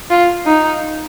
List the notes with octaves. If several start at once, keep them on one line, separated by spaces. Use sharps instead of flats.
F4
D#4